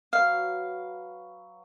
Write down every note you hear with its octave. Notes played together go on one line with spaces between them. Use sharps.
F#3 B4 F5